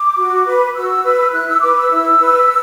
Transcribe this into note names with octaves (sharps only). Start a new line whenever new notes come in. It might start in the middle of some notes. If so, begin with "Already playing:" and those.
Already playing: D6
F#4
B4
F#4 E6
B4
E4 F#6
E6
B4 D6
E6
E4
B4